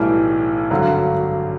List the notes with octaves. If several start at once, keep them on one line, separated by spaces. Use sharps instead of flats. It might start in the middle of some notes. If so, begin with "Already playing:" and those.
Already playing: B1 A2 E3 G3
G#1 G2 D3 F#3